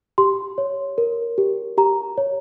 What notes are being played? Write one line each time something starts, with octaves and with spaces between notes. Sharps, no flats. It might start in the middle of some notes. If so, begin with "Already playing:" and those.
G4 C6
C#5
A#4
G4
G4 A#5
C#5